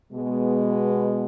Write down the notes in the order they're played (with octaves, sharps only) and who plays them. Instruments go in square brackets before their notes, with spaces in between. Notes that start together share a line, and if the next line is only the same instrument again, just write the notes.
[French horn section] B2 G#3 B3